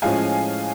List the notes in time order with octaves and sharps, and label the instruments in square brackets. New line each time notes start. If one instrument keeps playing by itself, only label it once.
[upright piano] A2 F3 G#3 C#4 [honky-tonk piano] F5 G#5